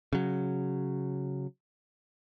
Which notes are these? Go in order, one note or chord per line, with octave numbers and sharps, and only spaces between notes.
C#3 F#3